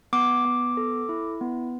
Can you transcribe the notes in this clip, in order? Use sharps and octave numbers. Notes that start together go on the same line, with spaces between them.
B3 D6
B3
A4
E4
B3